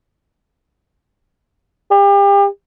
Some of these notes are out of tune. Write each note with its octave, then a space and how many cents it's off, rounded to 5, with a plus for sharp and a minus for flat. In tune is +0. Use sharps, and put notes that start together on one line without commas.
G4 +35